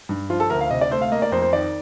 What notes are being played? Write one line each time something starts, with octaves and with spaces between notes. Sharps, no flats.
G2
F3 F4
A4
D2 A#4
F5
C3 D#5
D5
A3 C5
F5
A#3 D#5
D5
F2 C5
C5
D#3 D5